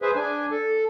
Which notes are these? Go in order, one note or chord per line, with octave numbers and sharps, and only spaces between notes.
G#4 B4 C5 E5
D4 G#5
A4